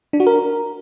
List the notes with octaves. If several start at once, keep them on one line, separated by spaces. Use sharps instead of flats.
D4
F#4
A#4